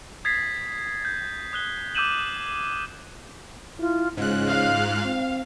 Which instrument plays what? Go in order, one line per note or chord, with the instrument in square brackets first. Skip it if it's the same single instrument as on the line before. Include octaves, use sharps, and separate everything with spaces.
[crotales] D#6 G#6 A6 B6 C7
G6
D#6 F#6 G7
D6 E6 G6 D#7 E7 F#7
[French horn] E4 [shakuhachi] F4
[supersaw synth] G#2 F#6 [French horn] C#3 [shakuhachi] F4
[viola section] F5
[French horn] C4